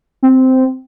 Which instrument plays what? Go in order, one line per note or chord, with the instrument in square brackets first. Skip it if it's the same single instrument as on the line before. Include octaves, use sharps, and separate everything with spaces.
[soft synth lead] C4